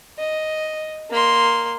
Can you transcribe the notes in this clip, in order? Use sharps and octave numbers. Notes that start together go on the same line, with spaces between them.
D#5
A#3 C6